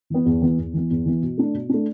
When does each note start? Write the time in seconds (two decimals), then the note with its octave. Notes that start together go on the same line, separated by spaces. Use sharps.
0.10 E3 B3
0.26 E2
0.42 E3 B3
0.58 E2
0.74 E3 B3
0.90 E2
1.06 E3 B3
1.23 B2
1.38 A3 D4
1.54 B2
1.69 A3 D4